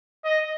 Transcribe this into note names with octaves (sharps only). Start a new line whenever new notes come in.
D#5